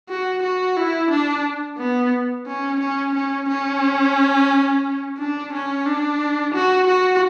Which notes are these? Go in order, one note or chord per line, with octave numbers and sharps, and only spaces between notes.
F#4
F#4
E4
D4
B3
C#4
C#4
C#4
C#4
D4
C#4
D4
F#4
F#4